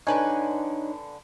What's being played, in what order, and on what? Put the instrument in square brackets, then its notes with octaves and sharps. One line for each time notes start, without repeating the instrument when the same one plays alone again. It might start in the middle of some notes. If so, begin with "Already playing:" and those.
[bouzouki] D3 B4 G#5 [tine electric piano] D4 D#4 C#5